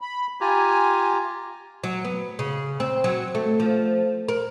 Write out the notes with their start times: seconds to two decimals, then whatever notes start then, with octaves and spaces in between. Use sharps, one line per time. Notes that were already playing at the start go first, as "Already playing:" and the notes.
0.01 B5
0.41 F4 G4 G#5 A#5
1.84 F#3
2.05 B3
2.39 C#3
2.80 C4
3.04 F#3
3.35 A3
3.60 F3
4.29 A#4